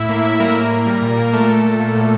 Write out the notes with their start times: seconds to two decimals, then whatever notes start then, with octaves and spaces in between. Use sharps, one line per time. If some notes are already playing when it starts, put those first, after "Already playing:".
Already playing: A2 E4 E5
0.09 A#3
0.24 A2 E4 E5
0.40 G3 A#3 A#4
0.56 A2
0.71 A#3
0.86 G3
1.02 A#2
1.17 A#2 A#3 A#4
1.33 A#2 A3 A4
1.48 A#2 A3 A4
1.64 A#2
1.80 A#3
1.95 A2